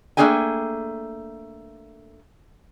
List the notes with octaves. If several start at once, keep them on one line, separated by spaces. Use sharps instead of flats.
A3 A#3 D4 G#4 G5 G#5